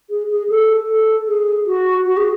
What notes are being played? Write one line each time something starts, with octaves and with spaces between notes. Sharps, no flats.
G#4
G#4
A4
A4
G#4
F#4
F#4
G#4